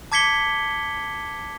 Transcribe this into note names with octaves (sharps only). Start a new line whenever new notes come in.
A5 D6 G#6 B6 C#7 G7